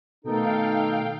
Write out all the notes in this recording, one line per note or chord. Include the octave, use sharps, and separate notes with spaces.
B2 D#3 A3 D#4 A4 F5 G5